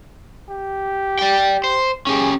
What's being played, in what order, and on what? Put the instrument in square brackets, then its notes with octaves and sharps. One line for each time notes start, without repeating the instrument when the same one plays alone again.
[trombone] G4
[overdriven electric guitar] D5 G5
C5
[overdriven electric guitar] C#4 G4 [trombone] G#4